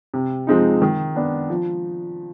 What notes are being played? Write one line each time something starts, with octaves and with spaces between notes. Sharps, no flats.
C3
F3 G#3 C4 D#4
D#3
B3 D4
F3